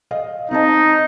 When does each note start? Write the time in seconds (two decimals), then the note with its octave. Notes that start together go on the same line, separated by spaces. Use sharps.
0.11 D#5 F5
0.51 C4 D#4 D#5 A5